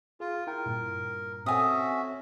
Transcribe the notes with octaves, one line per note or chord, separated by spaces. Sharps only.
F4 G#4
E4 A#4 G5
G2 A#2
C4 C#4 F#4 A4 E5 G#5 D#6